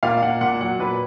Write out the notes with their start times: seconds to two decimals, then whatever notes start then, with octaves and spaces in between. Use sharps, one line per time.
0.03 A#2 F5
0.22 A#2 F#5
0.41 A#2 F#5
0.61 F#3 F#5
0.79 A#2 B4